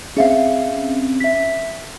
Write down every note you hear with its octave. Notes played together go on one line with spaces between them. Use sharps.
C4 C#4 G#4 E5 F5
E5 B6